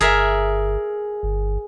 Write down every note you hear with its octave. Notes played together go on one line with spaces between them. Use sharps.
G1 G#4 A#4 E5
G1